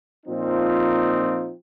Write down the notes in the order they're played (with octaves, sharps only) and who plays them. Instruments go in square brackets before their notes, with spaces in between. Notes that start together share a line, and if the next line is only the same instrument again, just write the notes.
[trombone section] A#2 F3 C4 D#4